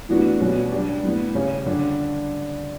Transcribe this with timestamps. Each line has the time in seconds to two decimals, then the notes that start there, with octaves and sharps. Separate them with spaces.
0.09 A2 E3 B3 D4 F#4
0.40 B2 G3 C#4 F#4
0.72 G3 D4 G4
1.03 A2 G3 B3
1.35 C#3 G3 C#4 G4
1.66 D3 G3 D4 G4